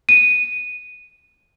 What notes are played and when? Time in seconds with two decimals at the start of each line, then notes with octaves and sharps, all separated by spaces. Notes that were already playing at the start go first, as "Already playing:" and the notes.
0.09 D#7